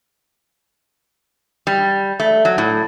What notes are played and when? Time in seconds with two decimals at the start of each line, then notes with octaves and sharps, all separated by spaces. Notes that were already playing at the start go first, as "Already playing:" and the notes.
1.67 G3
2.20 A3
2.45 F#3
2.58 A2